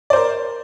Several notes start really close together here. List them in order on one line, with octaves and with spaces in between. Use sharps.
D5 C5 A#4